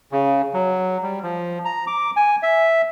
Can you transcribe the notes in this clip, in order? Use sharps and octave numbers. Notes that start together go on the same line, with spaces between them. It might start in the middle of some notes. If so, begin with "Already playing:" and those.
C#3
F#3
G3
F3
A#5
D6
G#5
E5